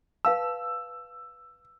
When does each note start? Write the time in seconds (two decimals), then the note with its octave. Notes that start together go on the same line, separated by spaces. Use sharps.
0.25 B4 F5 A5 E6